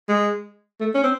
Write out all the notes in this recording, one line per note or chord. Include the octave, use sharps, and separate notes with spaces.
G#3
A3
C#4
C4